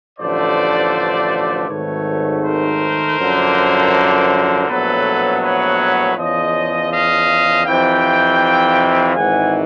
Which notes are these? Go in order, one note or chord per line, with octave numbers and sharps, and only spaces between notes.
A1 G2 D3 F3 A3 C5 D5
G#1 G#2 D#3 F#3 A3 B4 C#5
A#4 C5
F#2 D3 F3 A#3
A#1 A2 F#3 B3 A4 B4
B4 C#5
E2 C#3 F3 C#5 D#5
D#5 F5
F2 C3 E3 F5 G5
G#1 G#2 E3 F#5 G#5